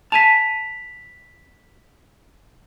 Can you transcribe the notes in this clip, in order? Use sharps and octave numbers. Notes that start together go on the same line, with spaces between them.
G#5 A5 B6 F7